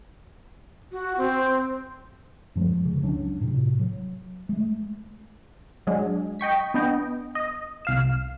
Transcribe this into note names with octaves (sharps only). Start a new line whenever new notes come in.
F#4
C4
F#2 F3 G3 G#3
C#3
C#2 F#3 C#4 D4
A2 C3
F#3
G#3 A3
F#3 G#3 D4
D#5 G5 C#6 B6
B3 D4 D#5 G5
D#5
C2 F5 E7